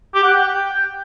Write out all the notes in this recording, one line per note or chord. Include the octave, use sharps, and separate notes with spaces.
G4
F#5
G5